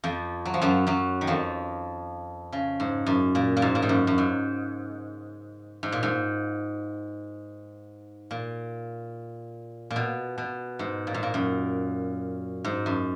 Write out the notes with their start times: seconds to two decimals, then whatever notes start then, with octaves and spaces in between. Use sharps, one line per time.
0.04 F2 F3
0.46 F#3
0.54 F3
0.62 F#2 F#3
0.87 F#2 F#3
1.21 D#3
1.27 F2 F3
2.53 C#3
2.80 G#2
3.06 F#2
3.35 A#2
3.57 A#2
3.62 G#2
3.75 A#2
3.82 G#2
3.89 F#2
4.07 F#2
4.18 G#2
5.83 G#2
5.92 A#2
6.03 G#2
8.31 A#2
9.91 A#2
9.96 B2
10.38 B2
10.79 G#2
11.07 A#2
11.14 G#2
11.23 A#2
11.34 F#2
12.65 G#2
12.86 F#2